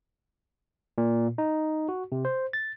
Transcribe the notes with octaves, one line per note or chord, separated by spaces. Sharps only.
A#2
D#4
F#4
C3
C5
A6